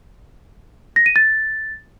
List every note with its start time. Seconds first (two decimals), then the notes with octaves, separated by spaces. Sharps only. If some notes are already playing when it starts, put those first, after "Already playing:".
0.96 A#6
1.06 D#7
1.16 A6